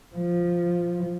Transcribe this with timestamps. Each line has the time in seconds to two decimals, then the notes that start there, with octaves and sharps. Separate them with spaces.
0.16 F3